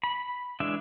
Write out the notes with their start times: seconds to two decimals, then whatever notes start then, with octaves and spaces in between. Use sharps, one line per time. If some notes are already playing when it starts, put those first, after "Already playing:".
0.04 B5
0.60 E3 G#3 D4 E5